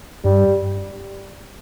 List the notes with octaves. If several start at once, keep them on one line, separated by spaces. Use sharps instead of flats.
G2 G3